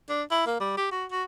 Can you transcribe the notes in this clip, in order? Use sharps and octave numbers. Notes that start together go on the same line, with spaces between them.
D4
E4
A#3
G3
G4
F#4
F#4